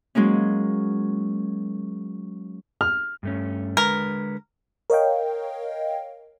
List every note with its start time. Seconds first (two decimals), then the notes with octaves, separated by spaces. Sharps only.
0.15 F#3 G#3 A#3 C#4
2.81 F6
3.23 G2 A3 C#4
3.77 D3 G#3 A#4 B4
4.90 A#4 C#5 D#5 F5 G5